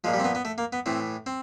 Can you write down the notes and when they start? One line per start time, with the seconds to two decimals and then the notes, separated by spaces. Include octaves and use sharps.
0.04 A#2 F3 G#3
0.14 G3
0.19 C4
0.24 B3
0.35 B3
0.45 A3
0.58 A#3
0.73 B3
0.86 A2 E3 C4
1.26 C4